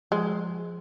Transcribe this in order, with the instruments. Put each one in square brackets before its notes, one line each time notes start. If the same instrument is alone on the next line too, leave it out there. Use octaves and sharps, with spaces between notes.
[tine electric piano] F3 [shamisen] G#3